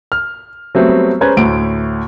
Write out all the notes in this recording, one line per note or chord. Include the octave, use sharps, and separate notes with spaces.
F6
F#3 G3 A3 B3 C4
G#3 C#4 B4 C5 A#5 G#6
D2 A2 D7